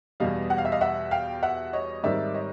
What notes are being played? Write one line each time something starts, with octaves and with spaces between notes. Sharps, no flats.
E2 B2 G3 D#5 F5
F#5
F5
E5
D#5 F5
E5 F#5
F5 G5
E5 F#5
C#5 D#5
G#2 D#3 G3 C4 D#4 D5 E5
C#5 D#5